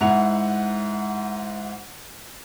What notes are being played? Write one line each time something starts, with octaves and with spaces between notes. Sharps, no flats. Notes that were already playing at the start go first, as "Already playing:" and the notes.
G#2 E4 F#5 F7